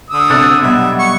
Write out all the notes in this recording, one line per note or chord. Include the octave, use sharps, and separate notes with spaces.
D3 D#6 E6
C3 D4 A4
B2 F#3 G3 E5
C#6